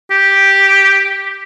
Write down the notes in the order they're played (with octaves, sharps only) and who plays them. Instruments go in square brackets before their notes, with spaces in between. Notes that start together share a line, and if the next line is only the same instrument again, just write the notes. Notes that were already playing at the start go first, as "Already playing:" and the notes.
[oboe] G4